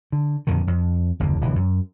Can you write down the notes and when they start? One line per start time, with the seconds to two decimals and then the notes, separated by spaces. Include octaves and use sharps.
0.12 D3
0.47 F2 A#2 D3 D#3
0.67 F2
1.20 F#1 D#2 D3
1.41 D1 C3 E3
1.56 F#2